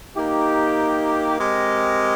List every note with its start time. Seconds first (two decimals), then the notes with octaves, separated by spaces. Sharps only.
0.15 A#3 D#4 G4
1.37 G#3 C4 G4 A#4 D#5